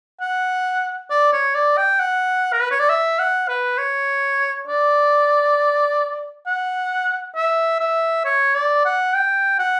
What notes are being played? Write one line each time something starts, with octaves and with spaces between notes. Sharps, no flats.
F#5
D5
C#5
D5
G5
F#5
A#4
B4
C#5
D5
E5
F#5
B4
C#5
D5
F#5
E5
E5
C#5
D5
F#5
G5
F#5